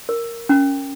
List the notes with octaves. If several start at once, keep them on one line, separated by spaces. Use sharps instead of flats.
A#4
C#4